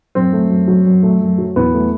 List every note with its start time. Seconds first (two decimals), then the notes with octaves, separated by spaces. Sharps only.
0.15 F#2 C4
0.33 A3
0.50 F#2
0.68 F#3
0.86 F#2
1.03 A3
1.21 F#2
1.38 F#3
1.56 E2 B3
1.74 A3